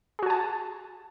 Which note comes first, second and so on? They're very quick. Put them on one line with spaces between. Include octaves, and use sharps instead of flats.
G#4 F#4 G#5 A5